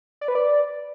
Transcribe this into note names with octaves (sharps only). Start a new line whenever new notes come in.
D5
B4
D5